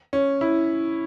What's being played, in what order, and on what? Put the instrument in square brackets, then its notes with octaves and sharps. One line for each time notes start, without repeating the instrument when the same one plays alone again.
[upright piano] C#4
E4